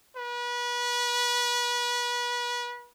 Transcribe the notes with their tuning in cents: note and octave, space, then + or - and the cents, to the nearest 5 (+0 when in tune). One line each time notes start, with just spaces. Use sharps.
B4 -30